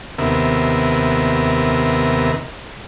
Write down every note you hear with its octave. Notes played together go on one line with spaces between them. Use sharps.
D#2 C3 B3 A#4 E5